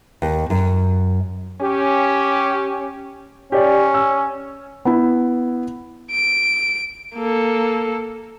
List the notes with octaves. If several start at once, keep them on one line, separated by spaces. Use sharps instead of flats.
D#2
F#2
C#4 G4
C#4 G4 C#5 D5
E6
B3 E4
D7
A#3 A4